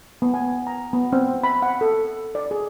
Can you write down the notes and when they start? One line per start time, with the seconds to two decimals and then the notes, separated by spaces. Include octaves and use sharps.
0.22 B3
0.34 G#5
0.67 A#5
0.93 B3
1.13 C4
1.44 B5
1.63 F#5
1.81 A4
2.35 D5
2.51 G#4